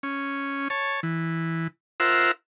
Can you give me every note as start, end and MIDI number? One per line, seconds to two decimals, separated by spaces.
0.03 0.68 61
0.70 1.00 73
0.70 1.00 81
1.03 1.67 52
2.00 2.31 65
2.00 2.31 70
2.00 2.31 72
2.00 2.31 76
2.00 2.31 78
2.00 2.31 88